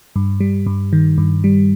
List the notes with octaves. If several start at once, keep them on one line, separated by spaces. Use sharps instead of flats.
G2
G3
G2
D#3
G2
G3